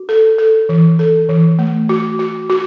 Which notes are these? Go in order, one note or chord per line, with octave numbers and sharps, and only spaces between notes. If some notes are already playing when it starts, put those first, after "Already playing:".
Already playing: F#4
A4
A4
E3
A4
E3
A3
F#4
F#4
F#4